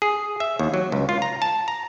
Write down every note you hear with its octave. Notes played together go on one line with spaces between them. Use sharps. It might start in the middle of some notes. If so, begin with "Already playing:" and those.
G#4
E5
D#2
F#3
C#2
F4
A#5
A5
A#5